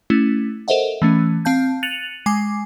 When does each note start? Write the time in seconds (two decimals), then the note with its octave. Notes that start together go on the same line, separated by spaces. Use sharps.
0.10 A3 C#4 E4
0.68 A4 A#4 C5 D#5 E5 F#5
1.02 E3 A3 C#4
1.45 C4 F5 A5 G6
1.83 F#6 A6 C#7 D#7 F7 F#7
2.26 G#3 G#5 D6 C7